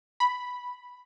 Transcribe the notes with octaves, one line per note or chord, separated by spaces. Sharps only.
B5